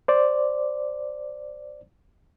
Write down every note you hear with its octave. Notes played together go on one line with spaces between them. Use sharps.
C5 D5